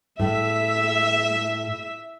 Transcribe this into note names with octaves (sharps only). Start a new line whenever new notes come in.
A2 E5